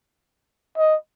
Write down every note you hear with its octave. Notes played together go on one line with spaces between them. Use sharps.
D#5